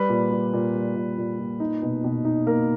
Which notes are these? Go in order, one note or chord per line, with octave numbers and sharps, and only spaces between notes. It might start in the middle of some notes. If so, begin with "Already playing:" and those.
Already playing: G3 B4
A#2
G3
A#2
G3
A#2
A#2
A#2
D#4
B2
B2
D#4
A#3 A#4